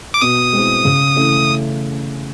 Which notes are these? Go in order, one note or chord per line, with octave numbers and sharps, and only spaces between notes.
D6
B2 D#6
G#3 C4 E4 G#4
C#3
E3 A3 C#4 E4